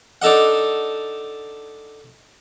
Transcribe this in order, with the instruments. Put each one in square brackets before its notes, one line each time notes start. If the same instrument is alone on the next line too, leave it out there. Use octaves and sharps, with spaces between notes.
[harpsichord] D4 D#4 A4 D#5 F#5